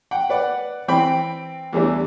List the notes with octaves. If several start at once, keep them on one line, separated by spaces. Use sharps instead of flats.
F#5 G5
B4 D5 F#5
E3 C4 G5 B5
E2 E3 G3 A3 D4